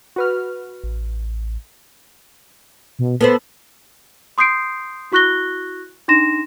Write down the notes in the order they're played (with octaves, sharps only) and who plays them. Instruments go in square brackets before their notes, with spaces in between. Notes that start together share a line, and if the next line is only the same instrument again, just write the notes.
[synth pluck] F#4 B4 F6
[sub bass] A1
[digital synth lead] B2
[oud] B3 B4 C5 [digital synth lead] A4
[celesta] C6 D#6 G6 C7 D7
E4 F#4 C#6 F#6 A#6 G7
D4 D#4 C6 A#6 E7